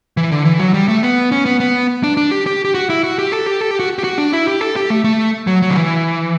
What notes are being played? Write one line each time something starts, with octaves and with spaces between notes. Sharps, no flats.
E3
D3
E3
F#3
G3
A3
B3
C#4
B3
B3
D4
D4
G4
G4
G4
F#4
E4
F#4
G4
A4
G4
A4
G4
F#4
G4
F#4
D4
E4
G4
A4
G4
A3
A3
F#3
F#3
D3
E3